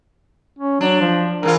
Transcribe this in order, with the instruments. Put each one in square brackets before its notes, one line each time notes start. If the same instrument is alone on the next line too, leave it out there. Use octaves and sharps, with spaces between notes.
[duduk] C#4
[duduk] F#3 [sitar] D4
[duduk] F3
[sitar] G#2 E3 F4 [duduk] A#4